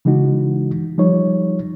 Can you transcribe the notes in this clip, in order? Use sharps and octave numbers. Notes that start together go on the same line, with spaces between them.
C#3 E3 G#3 D#4 F#4
F3 G3 D#4 C#5